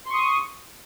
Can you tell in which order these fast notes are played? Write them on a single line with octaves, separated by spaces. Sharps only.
C6 C#6 D#6